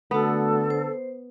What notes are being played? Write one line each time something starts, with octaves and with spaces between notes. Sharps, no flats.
D3 A3 B3 F#4 A4
C5